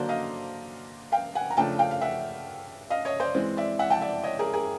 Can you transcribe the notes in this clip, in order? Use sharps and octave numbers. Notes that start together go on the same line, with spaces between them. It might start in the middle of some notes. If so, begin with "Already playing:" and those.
Already playing: D3 F#3 A#3 D4 C5 D5
D#5 F5
F5 G5
F#5 G#5
A#5
C#3 F3 A3 D4 G5 A5
F5 G5
F5
E5 F#5
D#5 F5
C#5 D#5
C5 D5
E3 G#3 C4
D5 E5
E5 F#5
G5 A5
D5 E5
C#5 D#5
G#4 A#4
G#4 A#4